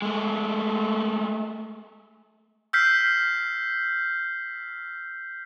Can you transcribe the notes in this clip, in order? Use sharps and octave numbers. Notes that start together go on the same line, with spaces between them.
G#3 A3
E6 F6 G6 B6 C7